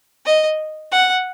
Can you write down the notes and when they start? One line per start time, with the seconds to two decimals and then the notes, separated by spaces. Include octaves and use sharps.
0.26 D#5
0.92 F#5